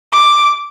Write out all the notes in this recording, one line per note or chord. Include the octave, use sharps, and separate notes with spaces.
D6